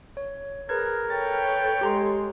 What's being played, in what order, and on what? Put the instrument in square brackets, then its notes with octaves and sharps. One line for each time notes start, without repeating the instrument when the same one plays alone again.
[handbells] C#5
[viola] G#4 [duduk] A#4 [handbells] B4 G#6
[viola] A4 C#5 [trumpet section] B4 G5 [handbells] A6
[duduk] G#3 [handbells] G4 A#5 C6